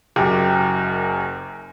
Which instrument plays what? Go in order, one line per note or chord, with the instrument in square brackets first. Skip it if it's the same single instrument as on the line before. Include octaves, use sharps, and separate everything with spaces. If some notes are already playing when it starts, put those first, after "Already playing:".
[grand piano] F#1 F#2 F#3 G4